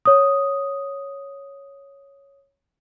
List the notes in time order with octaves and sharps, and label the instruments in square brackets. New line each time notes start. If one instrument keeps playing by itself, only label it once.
[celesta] C#5 D#6